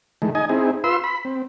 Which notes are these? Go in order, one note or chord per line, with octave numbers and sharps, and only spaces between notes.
D#3 E3 G#3 A3
D#4 D#5 G#5
C4 D#4 E4 G#4
F4 B4 C6 E6
B5
C4